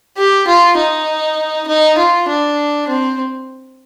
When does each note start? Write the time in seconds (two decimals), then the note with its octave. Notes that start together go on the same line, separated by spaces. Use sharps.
0.18 G4
0.48 F4
0.78 D#4
1.68 D#4
1.98 F4
2.29 D4
2.88 C4